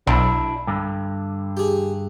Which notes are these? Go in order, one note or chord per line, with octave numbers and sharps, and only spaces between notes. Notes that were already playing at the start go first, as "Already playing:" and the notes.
B1 D4 E4
G2 D3
G4 G#4